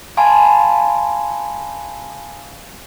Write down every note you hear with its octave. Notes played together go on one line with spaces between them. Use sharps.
F5 G#5 A5 B5 C6